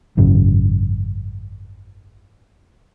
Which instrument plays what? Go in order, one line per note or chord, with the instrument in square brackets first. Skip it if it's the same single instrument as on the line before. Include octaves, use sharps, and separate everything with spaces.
[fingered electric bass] G#1 F#2 C#3